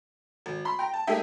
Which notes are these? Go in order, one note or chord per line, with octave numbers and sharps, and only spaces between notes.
G#1
B5 C6
G5 A#5
A5
G#3 A#3 D#4 G4 G#4 E5